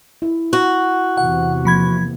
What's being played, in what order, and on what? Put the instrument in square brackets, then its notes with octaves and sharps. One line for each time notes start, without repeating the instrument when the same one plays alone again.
[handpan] E4
[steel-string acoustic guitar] F#4
[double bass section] E2 C3 [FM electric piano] F#5
[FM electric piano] F3 B5 G#6 [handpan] A#3